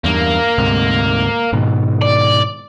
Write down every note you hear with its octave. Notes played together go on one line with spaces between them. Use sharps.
E2 G2 A#3
D2 G#2 C3
G#2 B2 D#3
D5